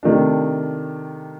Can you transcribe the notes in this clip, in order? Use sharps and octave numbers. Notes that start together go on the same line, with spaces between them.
C3 D#3 A3 D4